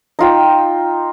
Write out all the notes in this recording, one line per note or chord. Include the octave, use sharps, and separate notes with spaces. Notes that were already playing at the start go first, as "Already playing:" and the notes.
D#4 F4 G5